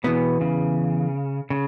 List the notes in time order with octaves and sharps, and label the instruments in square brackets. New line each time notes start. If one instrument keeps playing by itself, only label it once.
[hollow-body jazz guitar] E2 E3 B3 [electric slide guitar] B2
[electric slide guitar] C#3
C#3